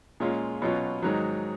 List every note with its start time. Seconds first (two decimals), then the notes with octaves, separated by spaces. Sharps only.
0.20 A#2 G#3 C#4 F4
0.62 B2 F#3 C#4 F4
1.02 G#2 D#3 F#3